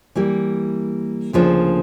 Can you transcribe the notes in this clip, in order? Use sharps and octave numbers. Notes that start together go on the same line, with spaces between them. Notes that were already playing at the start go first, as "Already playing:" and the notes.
E3 G3 A#3
D2 C#3 F3 A#3 D4